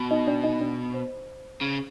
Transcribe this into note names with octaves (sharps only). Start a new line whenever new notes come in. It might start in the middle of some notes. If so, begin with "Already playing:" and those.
Already playing: B2
D#4 D#5
D4 D5
D#4 D#5
D4 D5
C5
C#3